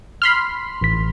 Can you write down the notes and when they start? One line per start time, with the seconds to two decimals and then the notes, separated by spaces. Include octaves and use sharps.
0.22 B5 C6 F6
0.81 A1 B6